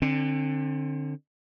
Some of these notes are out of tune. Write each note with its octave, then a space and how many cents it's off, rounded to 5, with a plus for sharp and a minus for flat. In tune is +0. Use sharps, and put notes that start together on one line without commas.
D3 +20 C4 +35